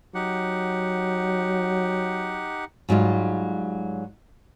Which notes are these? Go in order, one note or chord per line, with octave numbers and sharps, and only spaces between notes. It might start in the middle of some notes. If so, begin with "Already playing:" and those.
F#3 D#4 G4 F#5
G#2 F#3 G3 F4